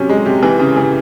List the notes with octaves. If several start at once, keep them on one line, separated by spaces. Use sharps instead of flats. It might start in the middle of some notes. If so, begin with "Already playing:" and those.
Already playing: C3 F#3 C#4
G#3
C3
E3
C#3
E3